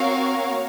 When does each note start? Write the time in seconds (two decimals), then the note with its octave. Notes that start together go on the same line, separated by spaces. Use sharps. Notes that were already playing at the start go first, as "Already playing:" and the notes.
Already playing: C4 F#4 A#4 C#5 F5
0.36 C4
0.45 B3
0.52 A#3